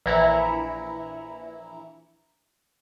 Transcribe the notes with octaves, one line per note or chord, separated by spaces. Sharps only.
A#1 E3 E4 A#5 C#7